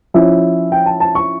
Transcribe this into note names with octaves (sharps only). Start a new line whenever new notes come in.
F3 C#4 E4 E5
G5
A5
A5
C#6